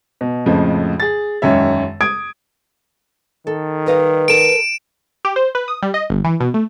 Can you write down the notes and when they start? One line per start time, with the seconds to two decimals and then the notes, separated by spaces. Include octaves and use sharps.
0.21 B2
0.46 F2 A2 C#3 F3 G#3
1.00 G#4 A6
1.42 E1 F#2 D#3 C#5 E5
2.01 D#6 G#6 D7
3.47 D#3 A4
3.87 G3 B4 D#5 F5
4.28 A4 A#4 D7 E7
5.25 G4
5.36 C5
5.55 B4
5.68 D#6
5.82 G3
5.94 D#5
6.10 G1
6.24 E3
6.40 B2
6.54 A3